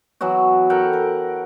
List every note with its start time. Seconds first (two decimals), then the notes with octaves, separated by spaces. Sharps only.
0.21 E3 F#3 B3 F#4
0.70 A4 A#4 F#5 G5
0.93 A#4